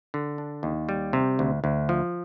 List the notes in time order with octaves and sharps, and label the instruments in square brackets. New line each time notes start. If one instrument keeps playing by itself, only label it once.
[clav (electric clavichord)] D3
D4
D#2
G3
C3
D2
D2
F3